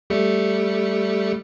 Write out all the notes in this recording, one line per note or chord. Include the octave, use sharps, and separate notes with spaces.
G3 A3 C#7